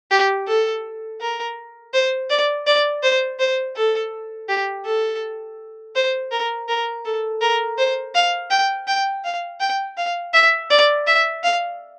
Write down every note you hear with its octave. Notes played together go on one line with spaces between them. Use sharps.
G4
A4
A#4
C5
D5
D5
C5
C5
A4
G4
A4
C5
A#4
A#4
A4
A#4
C5
F5
G5
G5
F5
G5
F5
E5
D5
E5
F5